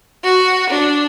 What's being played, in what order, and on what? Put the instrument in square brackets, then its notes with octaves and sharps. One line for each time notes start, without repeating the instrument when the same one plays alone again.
[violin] F#4
D4